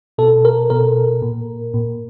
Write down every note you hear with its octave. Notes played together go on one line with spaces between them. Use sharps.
B2 A4
A#4
B2 A#4
A#2
A#2